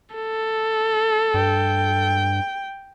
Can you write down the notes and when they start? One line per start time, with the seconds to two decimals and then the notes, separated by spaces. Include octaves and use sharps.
0.16 A4
1.34 G2 G5